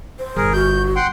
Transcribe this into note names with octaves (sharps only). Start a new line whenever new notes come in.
C5
G1 G#4 A#4
F#4 G6
F#5 G5 C6